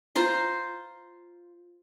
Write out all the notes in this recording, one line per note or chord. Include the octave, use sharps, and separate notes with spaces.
F4 C5 A#5 C6